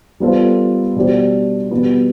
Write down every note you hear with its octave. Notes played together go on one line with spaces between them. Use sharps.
G3 B3 F4 A4 C5
B2 G3 D4 G4 C5
B2 G3 B3